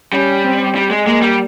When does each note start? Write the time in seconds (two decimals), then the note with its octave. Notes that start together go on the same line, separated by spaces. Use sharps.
0.13 G3 C#4
0.44 C4
0.75 G3
0.91 G#3
1.07 G#3 A#3
1.22 G3